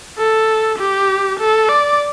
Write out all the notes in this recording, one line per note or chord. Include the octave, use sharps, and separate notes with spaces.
A4
G4
A4
D5